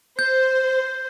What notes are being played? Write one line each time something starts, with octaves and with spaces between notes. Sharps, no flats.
C5 G6